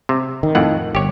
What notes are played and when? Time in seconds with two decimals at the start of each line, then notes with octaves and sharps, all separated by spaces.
0.09 C3
0.43 D#3
0.55 F2 A2 F#5
0.95 G1 G4 C#5